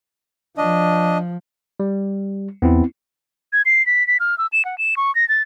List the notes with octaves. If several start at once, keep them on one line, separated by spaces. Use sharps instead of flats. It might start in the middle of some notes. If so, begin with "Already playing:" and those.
F3 D4 D#5
G3
E2 B3 C4 E4
G#6
C7
B6
B6
F6
E6
E7
F#5
E7
C#6
A#6
A6